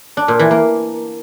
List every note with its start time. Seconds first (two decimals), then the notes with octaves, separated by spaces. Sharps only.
0.17 D4
0.28 A#2
0.39 E3
0.51 A#3